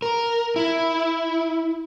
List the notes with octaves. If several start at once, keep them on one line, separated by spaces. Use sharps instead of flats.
A#4
E4